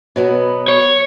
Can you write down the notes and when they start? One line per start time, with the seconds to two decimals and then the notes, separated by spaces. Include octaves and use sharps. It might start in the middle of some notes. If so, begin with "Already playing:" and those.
0.16 B2 F#3 B3
0.68 C#5